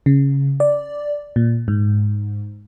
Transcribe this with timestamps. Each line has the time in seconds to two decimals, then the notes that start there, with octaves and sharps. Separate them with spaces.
0.06 C#3
0.60 D5
1.36 A#2
1.68 G#2